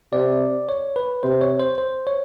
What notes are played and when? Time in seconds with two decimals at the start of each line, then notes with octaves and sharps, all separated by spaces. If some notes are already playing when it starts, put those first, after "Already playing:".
0.12 C3 D5
0.69 C#5
0.96 B4
1.23 C3 C5
1.41 C#5
1.59 C5
1.78 C5
2.07 C#5